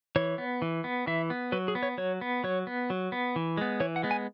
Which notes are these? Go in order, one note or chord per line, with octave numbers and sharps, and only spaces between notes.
E3 C#5
B3
E3
B3
E3 E5
B3
F#3 B4
G#4
B3
C#5
F#3 C#5
B3
F#3 C#5
B3
F#3
B3
E3
G#3 B3
E3 C#5
F#5
G#3 B3
G#5